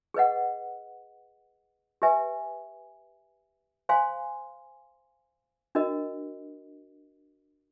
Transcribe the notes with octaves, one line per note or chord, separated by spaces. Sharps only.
G#4 B4 D#5 F#5
G4 B4 E5 G#5
C5 F5 G#5 C6
D4 F#4 A#4 D#5